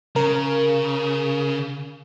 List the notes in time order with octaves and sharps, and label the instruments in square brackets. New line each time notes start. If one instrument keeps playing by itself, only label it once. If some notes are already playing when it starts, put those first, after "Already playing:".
[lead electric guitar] C#3 [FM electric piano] A#4